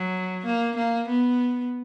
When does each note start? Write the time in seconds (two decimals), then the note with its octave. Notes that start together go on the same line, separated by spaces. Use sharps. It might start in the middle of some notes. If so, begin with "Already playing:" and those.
Already playing: F#3
0.46 A#3
0.77 A#3
1.08 B3